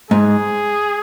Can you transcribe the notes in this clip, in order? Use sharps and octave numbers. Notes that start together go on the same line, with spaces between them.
G#2 G#4